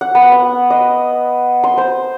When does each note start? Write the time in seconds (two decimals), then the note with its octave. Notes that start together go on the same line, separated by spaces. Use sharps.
0.01 F#5
0.15 B3
0.32 F#5
0.70 D#5
1.64 C6
1.78 C5